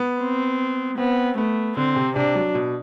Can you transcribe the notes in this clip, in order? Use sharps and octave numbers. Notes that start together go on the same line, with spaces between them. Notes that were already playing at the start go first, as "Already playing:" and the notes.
Already playing: B3
C4
B3 C4
A3 B3
D3 C4
C3
C3 D4
F#3
B2